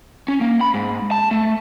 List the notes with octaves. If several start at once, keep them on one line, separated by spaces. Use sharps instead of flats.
C#4
A#3
B5
G#2
A5
A3